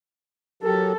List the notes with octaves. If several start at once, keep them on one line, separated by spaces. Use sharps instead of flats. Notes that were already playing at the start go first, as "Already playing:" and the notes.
F#3 G4 A4 A#4